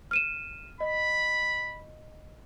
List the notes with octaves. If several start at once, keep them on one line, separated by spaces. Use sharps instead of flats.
F6 D#7 E7
D#5 B5